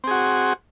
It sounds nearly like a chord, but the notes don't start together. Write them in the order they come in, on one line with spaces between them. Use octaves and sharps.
C4 G#4 F#4